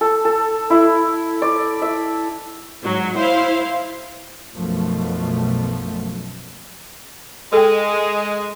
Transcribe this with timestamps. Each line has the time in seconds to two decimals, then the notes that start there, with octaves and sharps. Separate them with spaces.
0.01 A4
0.25 A4
0.70 E4
1.42 D5
1.82 E5
2.81 G#2 F#3
3.15 E4 C5 F5
4.54 B1 F#2 B2 F3 A3
7.53 G#3 A4 G5